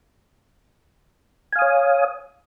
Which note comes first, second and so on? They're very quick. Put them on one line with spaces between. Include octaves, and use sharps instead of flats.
G#5 F5 D#6 C#5